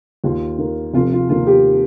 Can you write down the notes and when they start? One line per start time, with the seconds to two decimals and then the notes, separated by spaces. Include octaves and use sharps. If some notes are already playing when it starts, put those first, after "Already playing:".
0.24 D#2 F4
0.58 D#3 A#3
0.93 F1 F4
1.12 F4
1.29 D#2 D#3 A#3 F4
1.47 G4